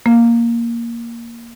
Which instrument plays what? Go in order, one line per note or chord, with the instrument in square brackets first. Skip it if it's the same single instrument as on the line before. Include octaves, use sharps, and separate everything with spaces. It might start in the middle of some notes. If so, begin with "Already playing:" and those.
[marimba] A#3